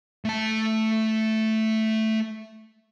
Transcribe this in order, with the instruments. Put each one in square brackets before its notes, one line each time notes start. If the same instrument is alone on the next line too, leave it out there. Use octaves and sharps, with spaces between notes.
[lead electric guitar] A3 A5